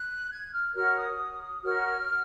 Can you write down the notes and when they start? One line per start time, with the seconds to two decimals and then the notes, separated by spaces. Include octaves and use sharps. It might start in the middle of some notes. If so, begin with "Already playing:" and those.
Already playing: F#6
0.31 G#6
0.52 F6
0.74 F#4 A#4 C#5 F6
0.97 D#6
1.62 F#4 A#4 C#5 F6